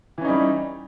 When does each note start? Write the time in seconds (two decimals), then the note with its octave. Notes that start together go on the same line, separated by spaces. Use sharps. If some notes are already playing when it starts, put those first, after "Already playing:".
0.18 E3
0.21 C#4
0.25 D#4
0.28 G3